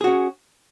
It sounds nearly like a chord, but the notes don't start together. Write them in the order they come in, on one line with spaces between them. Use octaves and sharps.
G#4 F#4 C#4